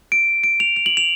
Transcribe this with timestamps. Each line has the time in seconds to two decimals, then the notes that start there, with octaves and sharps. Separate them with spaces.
0.12 D7
0.44 D7
0.60 F7
0.76 F7
0.86 F#7
0.97 F7